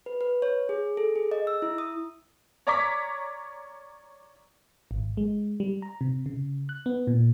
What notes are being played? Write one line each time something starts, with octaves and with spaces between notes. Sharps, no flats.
B4
B4
C#5
G#4
A4
G#4
D#5
E6
E4
D#6
C#5 D5 A#5 C#6 D6 B6
G#1
G#3
G3
A#5
C3
C#3
F#6
B3
A#2